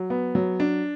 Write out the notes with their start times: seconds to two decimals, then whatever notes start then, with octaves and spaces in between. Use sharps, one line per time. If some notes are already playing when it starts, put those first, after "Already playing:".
Already playing: F#3
0.10 B3
0.35 F#3
0.60 D4